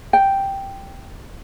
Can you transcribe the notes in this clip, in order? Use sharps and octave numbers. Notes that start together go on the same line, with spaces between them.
G5